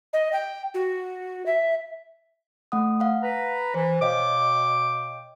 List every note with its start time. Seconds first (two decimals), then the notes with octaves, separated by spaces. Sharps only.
0.13 D#5
0.33 G5
0.74 F#4
1.46 E5
2.72 A3 F#5 D#6
3.00 F5 F#5
3.23 B4 A#5
3.74 E3 C5
4.01 B2 C#5 D#5 F5 G5 D6